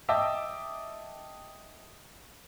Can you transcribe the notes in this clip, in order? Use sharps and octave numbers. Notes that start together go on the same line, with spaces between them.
D#5 E5 G5 A5 D6 E6